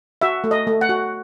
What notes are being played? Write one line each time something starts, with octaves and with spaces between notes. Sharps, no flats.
F#4 E5
A3
D#5
A3
F#5
F#4